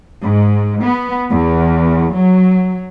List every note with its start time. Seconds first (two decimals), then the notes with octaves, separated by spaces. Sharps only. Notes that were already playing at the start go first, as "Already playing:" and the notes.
0.22 G#2
0.82 B3
1.30 E2
2.14 F#3